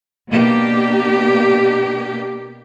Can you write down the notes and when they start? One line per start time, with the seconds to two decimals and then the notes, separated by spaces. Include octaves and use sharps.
0.29 B2 A#3 D4 G4